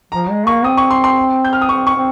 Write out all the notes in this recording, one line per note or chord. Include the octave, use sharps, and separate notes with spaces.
F3 A#5
G#3
A#3 C#6
C4 D#6
C#6
C6
C6
G6
F6
D#6
C4 C#6
C#6
C4